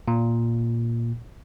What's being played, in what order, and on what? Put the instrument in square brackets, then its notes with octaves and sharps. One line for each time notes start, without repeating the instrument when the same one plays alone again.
[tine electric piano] A#2